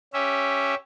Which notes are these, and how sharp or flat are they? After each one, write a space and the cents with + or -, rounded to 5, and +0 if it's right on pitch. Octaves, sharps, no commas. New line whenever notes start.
C#4 +0 G4 +0 E5 +0